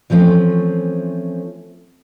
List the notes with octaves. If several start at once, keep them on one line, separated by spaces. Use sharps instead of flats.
E3 F3 A3 C4 C#4